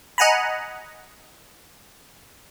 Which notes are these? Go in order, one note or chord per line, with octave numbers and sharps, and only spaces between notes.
D#5 F#5 G#5 A#5 B5